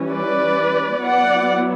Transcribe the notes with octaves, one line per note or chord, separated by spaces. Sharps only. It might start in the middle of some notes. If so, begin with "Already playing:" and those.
Already playing: E3 G3 C#4
B4 D5
F#3 B3 E4 D5 F#5